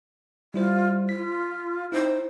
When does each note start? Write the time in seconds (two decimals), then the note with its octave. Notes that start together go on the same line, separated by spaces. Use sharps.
0.54 G3 E4 F4 C5
1.09 F4 B6
1.92 D#4 E4 C5